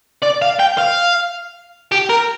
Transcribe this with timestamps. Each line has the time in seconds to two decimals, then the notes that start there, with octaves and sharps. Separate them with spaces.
0.22 D5
0.42 F5
0.60 G5
0.78 F5
1.92 G4
2.10 A#4